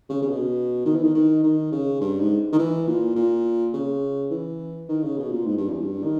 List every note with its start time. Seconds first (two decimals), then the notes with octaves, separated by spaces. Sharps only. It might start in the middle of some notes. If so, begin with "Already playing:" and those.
0.09 C#3
0.22 C#3
0.29 B2
0.85 D#3
0.95 E3
1.03 D#3
1.15 D#3
1.43 D#3
1.72 C#3
2.01 G2
2.20 G#2
2.52 D#3
2.58 E3
2.87 A#2
3.15 A#2
3.74 C#3
4.31 E3
4.89 D#3
5.03 C#3
5.18 B2
5.32 A#2
5.46 G#2
5.57 G2
5.70 E2
5.81 G2
6.04 D#3